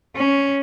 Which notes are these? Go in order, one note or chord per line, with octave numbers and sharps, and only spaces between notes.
C#4